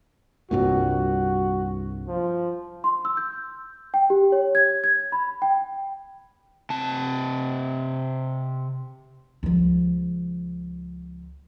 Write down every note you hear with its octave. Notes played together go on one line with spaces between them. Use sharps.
C2 G2 A#2 F#4
F3
C6
E6
G6
G5
G4
C#5
G#6
G#6
B5
G5
C3 A5
C#2 F3